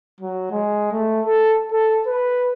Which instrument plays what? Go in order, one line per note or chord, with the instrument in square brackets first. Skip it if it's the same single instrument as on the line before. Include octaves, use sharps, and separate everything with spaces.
[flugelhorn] F#3
G#3
A3
A4
A4
B4